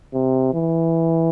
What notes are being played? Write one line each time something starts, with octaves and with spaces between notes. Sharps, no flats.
C3
E3